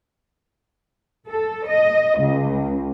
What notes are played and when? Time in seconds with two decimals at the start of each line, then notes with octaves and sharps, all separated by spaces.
1.28 A4
1.67 D#5
2.20 C#2